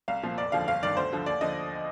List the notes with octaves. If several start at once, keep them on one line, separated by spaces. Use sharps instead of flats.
C2 F5
A#2 F3
F1 D5
D#2 D3 F3 F5
G1 F5
G2 D#3 D5
D2 C5
D3 F3
D#2 D5
D3 F3 D#5